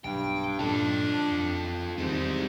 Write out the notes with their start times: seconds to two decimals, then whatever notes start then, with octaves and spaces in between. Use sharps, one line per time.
0.04 B1 G2 G5
0.59 G2 A#2 C#4 D4 F4 A4
1.31 F2
1.98 E2 G#2 D#3 G3 C4